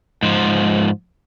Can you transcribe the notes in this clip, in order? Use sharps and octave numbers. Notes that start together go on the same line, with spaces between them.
G#2 F3